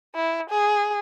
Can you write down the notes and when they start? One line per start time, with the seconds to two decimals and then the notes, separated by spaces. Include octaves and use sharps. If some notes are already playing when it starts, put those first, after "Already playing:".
0.15 E4
0.49 G#4